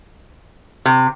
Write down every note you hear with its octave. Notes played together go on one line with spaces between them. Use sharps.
C3